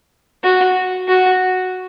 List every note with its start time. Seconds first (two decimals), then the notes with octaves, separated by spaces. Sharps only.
0.43 F#4
1.08 F#4